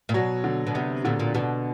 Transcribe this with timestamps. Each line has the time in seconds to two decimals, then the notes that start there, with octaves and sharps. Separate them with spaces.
0.09 A#2
0.14 B2 F#3
0.44 D3
0.67 B2
0.74 C3 B3
1.05 A#2 D3
1.20 A#2
1.35 B2 D3